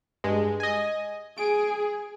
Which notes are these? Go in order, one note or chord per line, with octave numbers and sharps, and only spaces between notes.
G2 G#3
D#5 G#5
G#4 D7